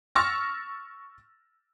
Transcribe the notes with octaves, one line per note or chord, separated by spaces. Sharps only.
C#6 E6 F6 A6 A#6